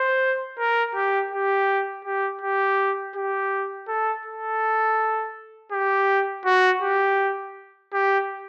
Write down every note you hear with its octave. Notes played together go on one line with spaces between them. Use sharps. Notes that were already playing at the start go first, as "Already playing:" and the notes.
Already playing: C5
A#4
G4
G4
G4
G4
G4
A4
A4
G4
F#4
G4
G4